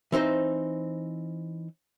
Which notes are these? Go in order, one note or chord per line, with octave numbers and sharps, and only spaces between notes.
E3 C4 D#4 C5